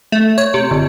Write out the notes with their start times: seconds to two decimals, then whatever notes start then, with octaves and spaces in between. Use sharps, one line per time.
0.12 A3
0.38 C#5
0.54 C3
0.71 G1